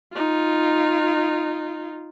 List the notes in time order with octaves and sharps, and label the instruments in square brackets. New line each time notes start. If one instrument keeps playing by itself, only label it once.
[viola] D#4 F4